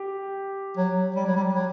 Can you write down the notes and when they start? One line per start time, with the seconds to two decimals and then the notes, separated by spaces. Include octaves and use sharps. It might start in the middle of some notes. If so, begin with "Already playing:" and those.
Already playing: G4
0.77 F#3
1.15 G3
1.26 F#3
1.36 G3
1.54 F#3